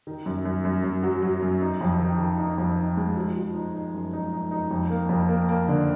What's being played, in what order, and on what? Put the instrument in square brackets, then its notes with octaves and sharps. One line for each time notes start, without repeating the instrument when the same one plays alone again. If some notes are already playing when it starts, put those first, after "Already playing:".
[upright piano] D#3
F#2
F#2
F#2
F#2
F#3
F#3
F#2
D#4
F2
D#3
D#3
D#4
F2
D#4
G#3
F3
F3
D#4
D#4
F#2
D#4
D#4
D#4
F2
A#3
F2
A#3
A#3
D3